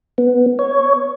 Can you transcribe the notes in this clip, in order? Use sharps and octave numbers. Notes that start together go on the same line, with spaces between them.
B3
C#5